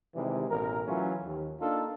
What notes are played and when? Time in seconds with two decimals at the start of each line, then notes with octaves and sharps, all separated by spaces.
0.15 C3 D#3 E3 G3 G#3
0.49 A1 B2 A#4
0.86 E3 F#3 A3 C#4 F4
1.25 D#2
1.61 A#3 D4 D#4 F4 A4